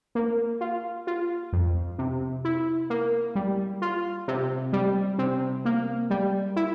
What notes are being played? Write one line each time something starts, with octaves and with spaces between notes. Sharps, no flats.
A#3
F4
F4
F2
C3
E4
A#3
G3
F4
C3
G3
C3
A#3
G3
E4